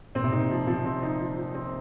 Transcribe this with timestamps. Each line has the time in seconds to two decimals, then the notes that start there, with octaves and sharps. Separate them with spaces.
0.15 A#2 C4
0.24 C3
0.32 A#2 D#4
0.50 F3
0.67 C3 F3
0.85 C4
1.02 D#4
1.20 F3
1.37 F3
1.55 C4